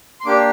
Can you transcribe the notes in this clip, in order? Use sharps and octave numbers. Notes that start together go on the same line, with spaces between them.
C6
A#3 D4 G4 D6